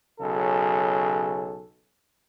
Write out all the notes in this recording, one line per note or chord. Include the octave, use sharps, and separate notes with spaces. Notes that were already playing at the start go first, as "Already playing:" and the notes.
B1 C#3 F#3 G#4 A4